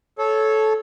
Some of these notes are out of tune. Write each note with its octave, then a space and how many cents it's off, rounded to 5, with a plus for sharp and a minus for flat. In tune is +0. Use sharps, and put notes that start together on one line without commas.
A4 -15 C#5 +0